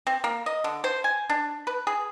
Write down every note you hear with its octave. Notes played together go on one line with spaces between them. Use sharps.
C4
A#3
D#5
D3
C5
G#5
D4
B4
G#4